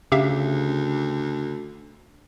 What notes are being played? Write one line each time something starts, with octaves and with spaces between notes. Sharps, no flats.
D2 C#3 G4 E5 F5